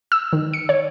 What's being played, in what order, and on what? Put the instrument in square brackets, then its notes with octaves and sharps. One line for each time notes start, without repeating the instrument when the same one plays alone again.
[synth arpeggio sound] E6
D#3
C#7
C#5